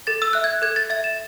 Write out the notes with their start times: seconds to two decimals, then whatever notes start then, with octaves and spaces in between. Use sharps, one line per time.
0.07 A4 A6
0.22 E6
0.33 E5 F#6
0.44 G#6
0.62 A4 G#6
0.76 A6
0.90 E5 A6
1.04 E7